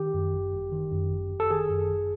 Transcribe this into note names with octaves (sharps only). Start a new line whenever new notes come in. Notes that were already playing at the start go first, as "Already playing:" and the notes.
Already playing: D#3 G4
F#2
G1
G1
D#3
F#2
G1
G1
A4
D#3 G#4
F#2
G1